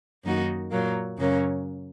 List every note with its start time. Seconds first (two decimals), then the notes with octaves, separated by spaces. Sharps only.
0.24 F#2 D#3 A#3 D#4 F#4
0.72 A#2 F#3 A#3
1.18 F#2 C#3 F#3 A#3 C#4